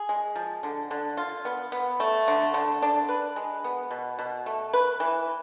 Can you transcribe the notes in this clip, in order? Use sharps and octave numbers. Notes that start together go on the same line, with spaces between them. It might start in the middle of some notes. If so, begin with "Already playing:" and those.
Already playing: G#4
G#3
F3
D3
D3
F4
B3
B3
A3
D3
D3
D4
B4
G#3
B3
B2
B2
A3
B4
E3